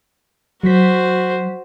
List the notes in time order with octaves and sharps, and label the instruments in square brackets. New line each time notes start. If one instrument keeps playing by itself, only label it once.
[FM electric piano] F#3 B6 [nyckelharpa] F#4 C5